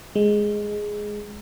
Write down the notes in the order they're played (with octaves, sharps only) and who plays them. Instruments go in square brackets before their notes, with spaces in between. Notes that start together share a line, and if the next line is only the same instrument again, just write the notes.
[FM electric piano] G#3